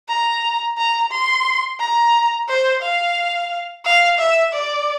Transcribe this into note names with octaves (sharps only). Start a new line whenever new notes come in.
A#5
A#5
C6
A#5
C5
F5
F5
E5
D5